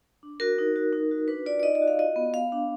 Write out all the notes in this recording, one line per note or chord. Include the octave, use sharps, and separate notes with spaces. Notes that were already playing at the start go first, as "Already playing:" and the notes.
D4
F#4 A#4
D#4
F#4
D#4
F#4
D4 B4
F4 D5
D5
D#4 D#5
D#5
F#4
F5
F4 D#5
B3
B3 F5
D4